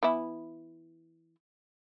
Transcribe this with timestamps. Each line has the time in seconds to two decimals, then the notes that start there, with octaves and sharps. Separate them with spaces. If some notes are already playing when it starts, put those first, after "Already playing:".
0.03 E3 B3 E4